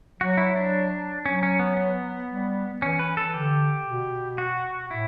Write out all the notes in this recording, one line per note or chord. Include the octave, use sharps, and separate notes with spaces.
F#3 F#4
E4
D4
F#3 C#4
C#4
B3
B3
G3
E3 C#4
B4
A4
D3 G4
B2
F#4
A2 E4